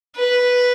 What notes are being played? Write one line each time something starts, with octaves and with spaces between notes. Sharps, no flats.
B4